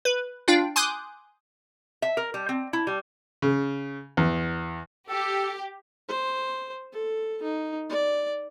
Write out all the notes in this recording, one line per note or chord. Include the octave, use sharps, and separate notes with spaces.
B4
D4 F4 F5 G5
G#5 C6 D6 D#6 F#6 G6
E5
A#4
G3
C4
E4
G3
C#3
E2
G4 A4
C5
A4
D#4
D5